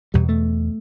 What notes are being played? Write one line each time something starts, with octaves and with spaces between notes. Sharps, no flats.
E2 B2 G3
A3